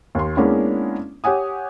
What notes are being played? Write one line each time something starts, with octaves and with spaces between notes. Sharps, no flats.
D#2 C6
G#3 A#3 B3 C#4 D4 E4
G4 C#5 F#5 G#5 D#6